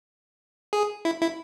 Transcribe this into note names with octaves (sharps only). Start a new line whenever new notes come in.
G#4
E4
E4